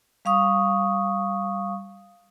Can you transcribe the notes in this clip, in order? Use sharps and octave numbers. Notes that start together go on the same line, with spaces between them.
G3 F5 C#6 D#6